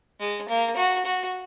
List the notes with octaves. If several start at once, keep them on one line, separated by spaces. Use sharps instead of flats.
G#3
A#3
F#4
F#4